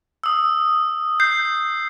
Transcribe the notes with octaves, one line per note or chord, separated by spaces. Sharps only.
D#6 E6
G6 C7